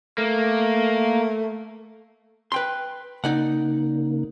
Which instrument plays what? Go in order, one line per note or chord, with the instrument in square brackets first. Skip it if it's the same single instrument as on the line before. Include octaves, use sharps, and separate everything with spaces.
[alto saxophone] A3 [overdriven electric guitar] A#3
[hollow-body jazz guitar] B4 G5 C6
[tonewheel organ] C#3 A#3 [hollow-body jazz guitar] D#4 D5 F#5